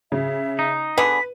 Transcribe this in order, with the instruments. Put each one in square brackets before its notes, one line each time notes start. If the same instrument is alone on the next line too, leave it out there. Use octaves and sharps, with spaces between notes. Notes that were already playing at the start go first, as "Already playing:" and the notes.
[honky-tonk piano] C#3 [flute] E5
[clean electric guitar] D#4
[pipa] D3 B3 G#4 [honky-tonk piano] B4 [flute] B6